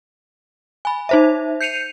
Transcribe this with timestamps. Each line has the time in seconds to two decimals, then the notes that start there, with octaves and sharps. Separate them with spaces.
0.85 G#5 B5
1.09 D#4 C5 E5
1.61 G6 C7 C#7 D#7 F7